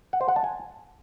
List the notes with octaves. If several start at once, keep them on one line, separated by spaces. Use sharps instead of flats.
F#5
C5
F#5
A5
G#5